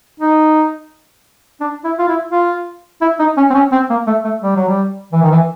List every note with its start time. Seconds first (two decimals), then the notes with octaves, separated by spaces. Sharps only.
0.20 D#4
1.60 D4
1.84 E4
1.98 F4
2.08 E4
2.32 F4
3.02 E4
3.19 D#4
3.37 C#4
3.50 C4
3.54 C#4
3.72 C4
3.90 A#3
4.07 A3
4.24 A3
4.42 G3
4.56 F#3
4.68 G3
5.13 E3
5.22 D#3
5.31 E3